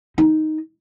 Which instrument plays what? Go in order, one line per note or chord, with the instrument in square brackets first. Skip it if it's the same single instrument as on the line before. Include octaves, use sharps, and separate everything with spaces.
[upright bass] D#4